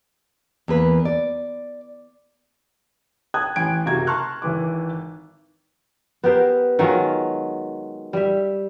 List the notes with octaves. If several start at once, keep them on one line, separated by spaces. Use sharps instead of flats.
E2 A#3 B4
D5
G5 A5 D#6 F#6 G#6
A1 G5 G#5 G#6 D7
F#1 C3 F#4 F5 A#5 G#6
A5 A#5 C6 C#6 F6 F#6
G#1 E3 D6
B3 G4 A#4 C5
D#3 F#3 G#3 F4
G3 E5